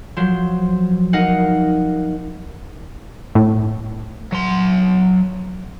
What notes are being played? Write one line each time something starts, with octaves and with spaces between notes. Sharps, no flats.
F3 F#3 C5
D#4 A#4 D#5 F5 F#5
A2
F#3 C6